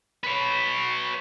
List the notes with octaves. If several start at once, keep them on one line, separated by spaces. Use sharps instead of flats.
B4 C#5